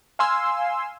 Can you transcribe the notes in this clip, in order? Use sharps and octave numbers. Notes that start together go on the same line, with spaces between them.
F5 G#5 C6 E6